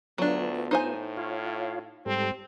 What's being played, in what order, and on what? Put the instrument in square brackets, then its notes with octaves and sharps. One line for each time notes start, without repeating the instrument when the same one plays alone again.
[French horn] D2 [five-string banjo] F#3 D4 [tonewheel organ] B3 F4
[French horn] A2 [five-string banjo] D#4 C5 G#5
[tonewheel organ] F4 C#5 F5
[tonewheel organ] G#2 G3 A4 [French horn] C4